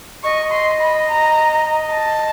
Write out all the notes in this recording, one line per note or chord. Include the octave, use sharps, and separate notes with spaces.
D#5 C#6
C6
B5
A#5
A5